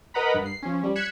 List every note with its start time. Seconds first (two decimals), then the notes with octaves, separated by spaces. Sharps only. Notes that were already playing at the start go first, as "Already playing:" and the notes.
0.14 A#4 B4 D#5 F#5 A#5 B5
0.34 G2
0.46 C7
0.62 F3 C#4
0.83 G3
0.95 F#6 G#6 B6 C#7 E7